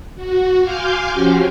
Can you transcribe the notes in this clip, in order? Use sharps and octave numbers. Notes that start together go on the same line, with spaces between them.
F#4
F5 G#5 C6 D6 F6 G6
F3 C#4 F#4 G4